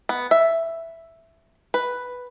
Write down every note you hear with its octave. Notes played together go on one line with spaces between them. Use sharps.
B3
E5
B4